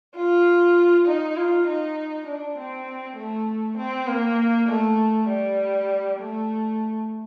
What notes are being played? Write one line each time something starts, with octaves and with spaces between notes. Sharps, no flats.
F4
D#4
F4
D#4
D4
C4
A3
C4
A#3
A3
G3
A3